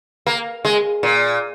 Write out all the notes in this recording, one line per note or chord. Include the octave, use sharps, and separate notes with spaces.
A#3
G#3
A#2